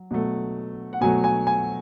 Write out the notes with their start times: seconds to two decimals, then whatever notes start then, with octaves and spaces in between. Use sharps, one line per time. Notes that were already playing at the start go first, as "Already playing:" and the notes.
Already playing: F#3
0.11 B2 F#3 A3
0.93 F#5
1.01 B2 F#3 A3 G#5
1.24 G#5
1.47 G#5